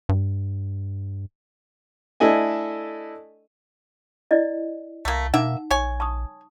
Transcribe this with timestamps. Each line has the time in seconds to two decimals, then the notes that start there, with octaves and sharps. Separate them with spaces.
0.09 G2
2.20 A3 D4 E4 A4 D#5 G#5
4.31 E4 D5 D#5
5.05 C2 A3 A#3
5.34 B2 A#3 D#4 E5 F#5
5.71 A#1 C#5 G#5
6.00 A5 C#6 D#6